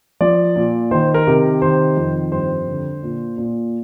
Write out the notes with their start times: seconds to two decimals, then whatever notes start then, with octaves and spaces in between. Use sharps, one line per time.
0.21 F3 D5
0.56 A#2
0.91 D#3 C5
1.14 A#4
1.27 C3
1.62 D#3 C5
1.97 F2
2.32 G2 C5
2.68 D3
3.03 A#2
3.38 A#2